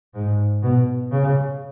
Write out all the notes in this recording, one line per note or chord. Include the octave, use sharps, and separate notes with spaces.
G#2
B2
C#3